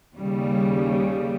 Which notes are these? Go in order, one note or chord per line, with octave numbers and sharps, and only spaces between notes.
D#2 C#3 G3